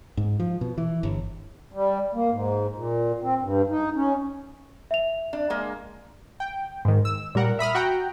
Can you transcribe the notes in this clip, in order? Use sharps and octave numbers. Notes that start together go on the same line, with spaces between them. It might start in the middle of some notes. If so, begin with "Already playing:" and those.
G#2
F3
B2
E3
G1
G3
A#3
G#2
A#2
C4
G2
D#4
C#4
E5 F7
D4
G#3 A#3
G5
G#2 D#3
E6
A#2 G3 A#4 F#5
E5 B5 D#6 F6
F#4 F#5 G5 A#5